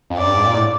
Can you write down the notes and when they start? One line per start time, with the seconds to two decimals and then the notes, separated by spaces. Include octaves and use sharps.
0.10 F2
0.18 F#2 D5
0.27 G2
0.36 G#2
0.46 A#2
0.54 A2